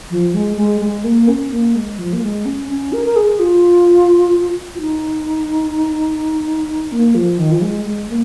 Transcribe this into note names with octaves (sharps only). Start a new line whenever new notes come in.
F3
G#3
G#3
G#3
A#3
C#4
A#3
G#3
F3
A#3
G#3
C#4
C#4
A#4
A#4
G#4
F4
F4
D#4
A#3
F3
D#3
F3
G#3
G#3
A#3